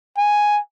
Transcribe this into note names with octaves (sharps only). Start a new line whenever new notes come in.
G#5